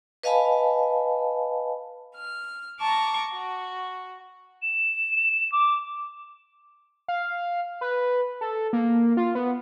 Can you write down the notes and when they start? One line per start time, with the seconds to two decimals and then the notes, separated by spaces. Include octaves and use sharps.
0.23 B4 D#5 F5 G#5 A5 B5
2.15 F6
2.81 A5 A#5 C#6 D6
3.34 F#4
4.62 E7
5.52 D6
7.08 F5
7.81 B4
8.41 A4
8.73 A#3
9.17 F4
9.35 B3